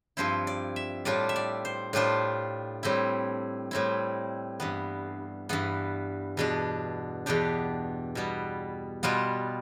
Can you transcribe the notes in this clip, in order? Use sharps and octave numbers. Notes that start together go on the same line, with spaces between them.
G2 F3 C4 E4 C5
D5
E5
A2 G3 D4 F4 D5
E5
D5
C5
A2 G3 D4 F4 C5
A2 G3 C4 E4
A2 G3 C4 E4
G2 E3 B3
G2 E3 B3
E2 B2 B3 D4
E2 B2 B3 D4 G4
B2 G3 B3
B2 G3 B3 F4